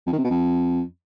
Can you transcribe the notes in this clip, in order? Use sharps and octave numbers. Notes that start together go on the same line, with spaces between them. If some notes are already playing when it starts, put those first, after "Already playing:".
F2
D#3
C3
B2
F2